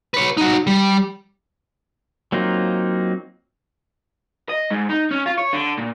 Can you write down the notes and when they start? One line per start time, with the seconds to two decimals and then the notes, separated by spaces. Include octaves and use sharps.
0.14 B4 C#5
0.37 D#4 F#4
0.67 G3
2.32 F#3 A#3 C4 D#4 F4
4.50 D#5
4.71 G#2
4.90 D#4
5.11 C#4
5.26 F4
5.37 C#5
5.53 D3
5.77 A#2